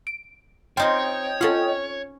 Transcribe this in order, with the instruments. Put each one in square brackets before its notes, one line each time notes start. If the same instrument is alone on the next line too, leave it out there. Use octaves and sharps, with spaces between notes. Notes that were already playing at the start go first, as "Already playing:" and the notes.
[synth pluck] D7
[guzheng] C4 D#4 F4 [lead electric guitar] C#5 [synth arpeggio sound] D#5 G5
[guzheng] C#4 F#5 [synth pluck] F4 A4